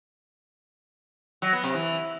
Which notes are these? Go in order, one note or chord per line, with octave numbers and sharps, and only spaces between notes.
F#3
B3
C3
E3